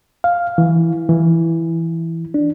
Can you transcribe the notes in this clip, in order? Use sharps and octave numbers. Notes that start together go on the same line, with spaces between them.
F5
E3
E3
D4